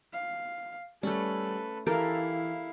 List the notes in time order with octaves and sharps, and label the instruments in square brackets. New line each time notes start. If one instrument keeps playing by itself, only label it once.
[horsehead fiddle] F5
[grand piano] G3 [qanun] A3 C#4 [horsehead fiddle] A4 B4
[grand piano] E3 [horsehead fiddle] E4 F5 [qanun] G4 A4 A#4